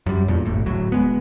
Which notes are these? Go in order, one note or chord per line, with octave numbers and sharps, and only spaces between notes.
F#2 G3
E2 G2 A#2
D1 G1 A2
D1 A2 F#3
D1 G#3 B3